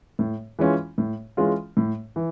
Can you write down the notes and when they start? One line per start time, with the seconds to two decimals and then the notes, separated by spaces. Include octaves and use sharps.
0.19 A2
0.59 E3 G#3 C#4 F4
0.98 A2
1.37 E3 G#3 C#4 F4
1.77 A2
2.16 E3